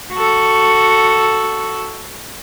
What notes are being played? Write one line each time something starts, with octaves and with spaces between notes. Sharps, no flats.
F#4 A4